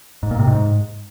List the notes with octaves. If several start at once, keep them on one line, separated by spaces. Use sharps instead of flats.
G#2
A#2
C3
G#2